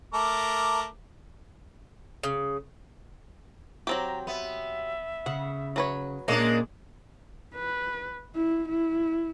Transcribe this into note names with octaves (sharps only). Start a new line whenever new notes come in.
A3 A#4 D6
C#3
F#3 C4 G4 A#5
B3 E5
C#3 F#5
F#3 B4 C#5
A#2 G#3 A#3 C#4 D4 A#6
B4
E4
E4